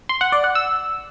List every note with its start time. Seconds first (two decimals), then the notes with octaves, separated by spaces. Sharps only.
0.09 C6
0.21 F#5
0.32 D5
0.44 F#5
0.55 E6